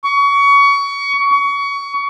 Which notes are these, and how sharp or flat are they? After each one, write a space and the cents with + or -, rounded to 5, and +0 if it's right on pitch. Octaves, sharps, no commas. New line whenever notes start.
C#6 +25
C#6 +25